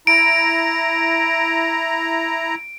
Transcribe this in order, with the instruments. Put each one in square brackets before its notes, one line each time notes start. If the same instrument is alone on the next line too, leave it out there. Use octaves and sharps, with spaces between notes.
[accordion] E4 A#5 [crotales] D7